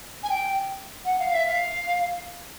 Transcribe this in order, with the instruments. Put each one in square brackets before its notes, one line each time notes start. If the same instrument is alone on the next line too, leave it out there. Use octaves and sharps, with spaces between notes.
[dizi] G#5
G5
F#5
F5
E5
F5